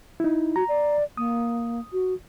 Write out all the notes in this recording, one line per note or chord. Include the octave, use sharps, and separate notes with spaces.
D#4 E4
F#4 A#5
D5
A#3 D#6
F#4